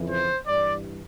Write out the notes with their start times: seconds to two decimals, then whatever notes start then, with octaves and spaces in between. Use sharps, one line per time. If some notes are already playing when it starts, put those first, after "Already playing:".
Already playing: F2 C#3 E3
0.11 C5
0.47 G2 E3 D5